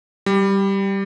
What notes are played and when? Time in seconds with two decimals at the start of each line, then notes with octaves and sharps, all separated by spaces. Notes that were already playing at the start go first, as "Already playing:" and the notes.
0.26 G3